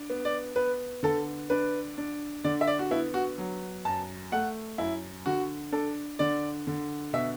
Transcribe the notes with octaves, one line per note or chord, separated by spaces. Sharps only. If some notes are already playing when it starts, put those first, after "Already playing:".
Already playing: D4
B3
D5
B3 B4
D3 A4
D4 B4
D4
D3 D5
E5
D5
F#4
B3 E4
F#4
F#3
F#2 A5
A3 F#5
F#2 E4
D3 F#4
D4 A4
D3 D5
D3
B2 E5